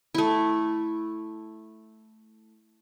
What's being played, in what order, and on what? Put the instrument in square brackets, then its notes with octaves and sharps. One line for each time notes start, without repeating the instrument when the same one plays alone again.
[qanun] A3 E4